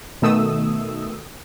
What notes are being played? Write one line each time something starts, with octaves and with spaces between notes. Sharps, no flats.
B2 D#3 A3 D#6 E6